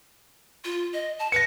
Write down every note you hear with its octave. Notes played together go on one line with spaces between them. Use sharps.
F4
D#5
A5
B4 A#6 C#7